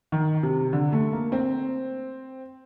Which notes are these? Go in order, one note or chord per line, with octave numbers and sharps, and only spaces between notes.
D#3
C3
D3
A3
A#3
C4